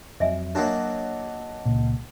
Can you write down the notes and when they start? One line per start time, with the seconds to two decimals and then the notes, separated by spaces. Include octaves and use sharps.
0.20 F2 F#3 D#5 E5 G#5
0.55 F#3 A#3 D4 D#5 F#5 A5
1.65 C#2 A#2